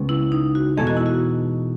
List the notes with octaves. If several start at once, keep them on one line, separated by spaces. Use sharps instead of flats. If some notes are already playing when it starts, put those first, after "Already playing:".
Already playing: C#2 C#3 G#3 B3
E4
D#4
F#4
E2 B2 G#3 D#4 G#4 A4
F#4
E4
F#4